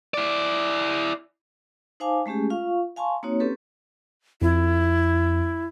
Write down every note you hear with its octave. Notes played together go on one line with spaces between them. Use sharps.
E4 D5
D#4 C5 F5 G#5 A5 D6
G#3 A3 C#4 G4 G#4
F4 F5 C#6
F5 G#5 A5 C6 C#6
A#3 C4 D#4 F#4 C#5
A#3 C4 C#4 G4 A4 B4
F2 E4